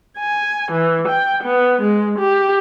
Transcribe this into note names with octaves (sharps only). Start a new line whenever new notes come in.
G#5
E3
G5
B3
G#3
G4